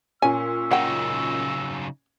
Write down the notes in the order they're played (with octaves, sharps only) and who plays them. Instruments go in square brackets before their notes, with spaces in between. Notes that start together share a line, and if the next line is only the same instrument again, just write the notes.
[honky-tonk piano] A#2 C#4 [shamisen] G#5 [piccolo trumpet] E6
[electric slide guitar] C#3 F#3 D#4 [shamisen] F#5 G5